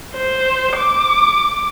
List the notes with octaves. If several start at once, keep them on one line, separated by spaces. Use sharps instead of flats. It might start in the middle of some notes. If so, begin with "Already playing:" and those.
C5
D6